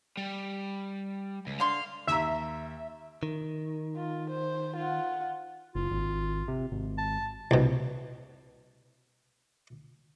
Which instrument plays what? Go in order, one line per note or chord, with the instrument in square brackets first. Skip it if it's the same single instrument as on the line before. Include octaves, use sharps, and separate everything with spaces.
[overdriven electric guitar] G3
C#2
[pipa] D3 C6 [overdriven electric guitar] F5
[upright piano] D#2 A#5 [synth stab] E5
[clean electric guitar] D#3
[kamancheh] F4
C5
F4 F#5
[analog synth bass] F#1 [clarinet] F4
[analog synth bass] G#1
C3
G#1
[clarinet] A5
[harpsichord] C2 B2